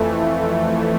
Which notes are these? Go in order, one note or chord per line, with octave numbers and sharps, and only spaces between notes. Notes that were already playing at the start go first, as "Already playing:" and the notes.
Already playing: F2 E3 A3